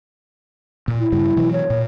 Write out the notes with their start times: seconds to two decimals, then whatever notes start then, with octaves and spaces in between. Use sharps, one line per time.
0.88 A#2
1.00 E4
1.12 G2 C#3 G3
1.37 B2 E3 F#3
1.53 C#5
1.70 A#2